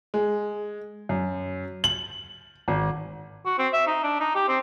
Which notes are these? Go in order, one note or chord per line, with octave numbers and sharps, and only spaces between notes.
G#3
F#2
F#7
G#1
F#4
C4
E5
D#4
D4
D#4
G4
C4